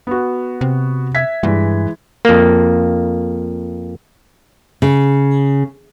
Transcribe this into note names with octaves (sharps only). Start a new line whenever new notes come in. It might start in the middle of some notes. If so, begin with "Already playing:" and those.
B3 F#4
C3
E5 G#6 B6
G2 E3 G#3
F2 A#3
C#3